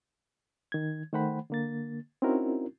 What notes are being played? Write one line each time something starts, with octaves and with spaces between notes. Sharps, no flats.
D#3 G#6
D#3 A3 C5 F#5 G5 B5
D3 A#3 A6
C4 C#4 D#4 E4 F#4 A#4